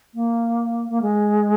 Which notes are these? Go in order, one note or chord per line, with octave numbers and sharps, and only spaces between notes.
A#3
A#3
G#3